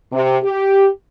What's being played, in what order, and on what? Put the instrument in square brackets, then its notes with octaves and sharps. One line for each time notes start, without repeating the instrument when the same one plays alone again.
[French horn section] C3
G4